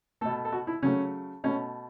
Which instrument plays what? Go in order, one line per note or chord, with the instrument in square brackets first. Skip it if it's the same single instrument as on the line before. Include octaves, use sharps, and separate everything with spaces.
[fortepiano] B2 A3 A4
A4
F#4
E4
C#3 F#3 A3 C#4
B2 A3 C#4